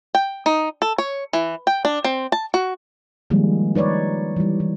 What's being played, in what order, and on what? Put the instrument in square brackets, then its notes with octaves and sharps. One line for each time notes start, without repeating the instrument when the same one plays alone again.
[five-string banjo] G5
D#4
A4
C#5
E3
G5
D4
C4
A5
F#4
[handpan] D#3 F3 G3 G#3 A#3
D#4 B4 C#5 D5
E3 G3
E3